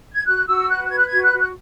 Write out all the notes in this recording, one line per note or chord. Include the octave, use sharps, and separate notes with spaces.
G#6
F#4 F#6
F#4 E6
B4 F#6
F#6
B4 G#6
F#6
F#4 G#6
F#6
F#4
F#6